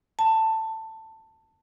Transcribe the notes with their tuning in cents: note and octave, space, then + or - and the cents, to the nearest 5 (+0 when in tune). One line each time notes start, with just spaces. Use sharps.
A5 +15